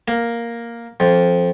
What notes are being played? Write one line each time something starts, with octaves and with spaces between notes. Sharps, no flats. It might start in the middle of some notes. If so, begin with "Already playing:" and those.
A#3
F2